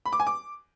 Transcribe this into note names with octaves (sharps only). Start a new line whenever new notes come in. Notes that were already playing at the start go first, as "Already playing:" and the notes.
B5
D6
G#5
D6